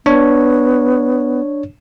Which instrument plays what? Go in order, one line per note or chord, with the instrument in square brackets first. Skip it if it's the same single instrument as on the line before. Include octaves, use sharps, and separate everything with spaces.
[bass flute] B3 [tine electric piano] D4 C#5